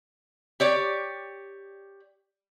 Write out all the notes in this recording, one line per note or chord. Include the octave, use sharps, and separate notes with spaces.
G4 C#5 D5